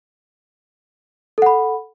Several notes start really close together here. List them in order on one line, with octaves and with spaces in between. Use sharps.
A4 F#5 B5